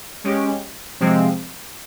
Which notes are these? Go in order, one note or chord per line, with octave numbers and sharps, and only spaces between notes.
G#3 C#4 G4
C3 F3 G#3 C4